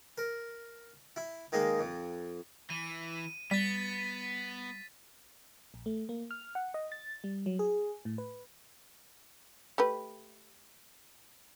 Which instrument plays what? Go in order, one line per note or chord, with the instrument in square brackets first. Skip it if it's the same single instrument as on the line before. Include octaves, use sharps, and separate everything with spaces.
[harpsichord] A#4
E4
D#3 G#3 A#3 D#4
F2
[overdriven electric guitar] E3 [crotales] D#7
[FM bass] G3 [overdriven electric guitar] B3 [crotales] A6 B6
[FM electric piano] A#1
A3
A#3
F6
F#5
D#5
A6
G3
F#3
G#4
A2
B4
[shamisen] A3 G4 B4